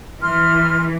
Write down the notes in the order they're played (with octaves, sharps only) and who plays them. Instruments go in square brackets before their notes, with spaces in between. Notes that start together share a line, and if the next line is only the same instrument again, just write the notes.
[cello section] E3 [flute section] C6 F6